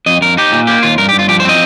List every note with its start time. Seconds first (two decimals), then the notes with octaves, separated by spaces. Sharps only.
0.06 F2 D#5
0.21 F2 A#4
0.37 D#4 G4
0.52 A#2
0.67 A#3 G4
0.83 D#2 F4
0.98 G2 A#4
1.09 G4
1.14 G2
1.19 F4
1.28 F3 G4
1.40 C5
1.45 C4 D#5